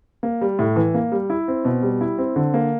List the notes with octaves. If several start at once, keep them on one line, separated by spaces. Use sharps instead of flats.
A#3
G3
A2
E3
A#3
G3
E4
C4
B2
G3
E4
C4
D3
A#3